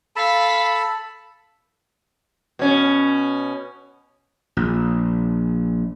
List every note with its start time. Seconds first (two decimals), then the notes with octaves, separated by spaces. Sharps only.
0.16 A4 F5 A5 B5 B6
2.59 B2 C#4
4.57 A#1